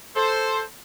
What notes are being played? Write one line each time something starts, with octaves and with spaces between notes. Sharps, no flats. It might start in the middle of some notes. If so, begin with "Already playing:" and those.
A4 C5